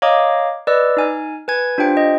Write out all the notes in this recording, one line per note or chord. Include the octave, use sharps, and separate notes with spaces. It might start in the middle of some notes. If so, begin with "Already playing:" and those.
C#5 D#5 F5 A#5 D6 D#6
B4 D5 D#5 E6
D#4 G#5 F6
B4 G#5 G#6
D4 F4 G4 C5 G5
D#5